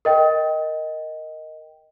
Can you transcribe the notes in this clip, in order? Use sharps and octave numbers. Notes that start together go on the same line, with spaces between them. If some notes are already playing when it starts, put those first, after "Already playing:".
A#4 D#5 G5